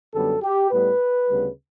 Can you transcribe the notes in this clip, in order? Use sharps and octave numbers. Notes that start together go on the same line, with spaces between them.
F#2 D3 G3 B3 A4
G4
A2 G3 B3 B4
D2 C#3 G3 B3